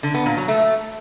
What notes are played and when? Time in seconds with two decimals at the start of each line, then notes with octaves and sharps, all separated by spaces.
0.03 D3
0.14 B3
0.26 A#2
0.37 F#3
0.48 A3